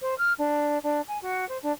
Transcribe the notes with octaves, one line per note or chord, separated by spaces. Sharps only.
C5
F6
D4
D4
G#5
F#4
C5
D4